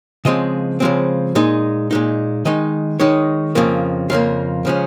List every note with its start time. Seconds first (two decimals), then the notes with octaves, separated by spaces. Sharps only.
0.25 C#3 F3 G#3 C4 D#5
0.80 C#3 F3 G#3 C4
1.35 A#2 G#3 D#4
1.91 A#2 G#3 D#4
2.45 D#3 G#3 D#4 D#5
3.00 D#3 G#3 D#4 C#5
3.55 F2 C#3 F3 A#3
4.10 F2 C#3 F3 A#3 F5
4.65 C#3 F3 G#3 C#4